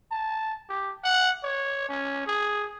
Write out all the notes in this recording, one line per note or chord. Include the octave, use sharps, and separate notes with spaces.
A5
G4
F#5
C#5
C#4
G#4